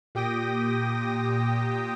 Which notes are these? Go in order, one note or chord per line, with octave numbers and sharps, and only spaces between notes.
A#2 G4 G5 D#6 A#6